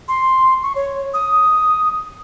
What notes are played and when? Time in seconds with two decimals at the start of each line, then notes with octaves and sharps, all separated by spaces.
0.08 C6
0.63 C#6
0.76 C#5
1.14 D#6